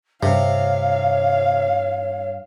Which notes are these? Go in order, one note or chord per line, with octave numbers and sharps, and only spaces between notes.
G2 C3 C#5 F5